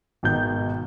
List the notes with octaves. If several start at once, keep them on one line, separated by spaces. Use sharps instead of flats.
G#1 B2 D#3 G6